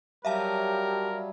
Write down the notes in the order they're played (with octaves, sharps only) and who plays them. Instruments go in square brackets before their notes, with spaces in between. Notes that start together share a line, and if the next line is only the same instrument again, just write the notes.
[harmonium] F#3 G3 [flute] G4 [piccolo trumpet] A#4 [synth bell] E5 F5 A5